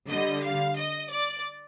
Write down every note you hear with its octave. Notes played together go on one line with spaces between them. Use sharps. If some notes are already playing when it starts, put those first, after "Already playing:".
D3 G3 D#5
F5
D#5
D5